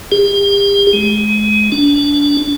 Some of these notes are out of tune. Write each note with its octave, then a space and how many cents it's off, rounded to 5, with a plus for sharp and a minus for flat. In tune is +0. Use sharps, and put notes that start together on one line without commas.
G4 +40
G#3 +30
D4 -30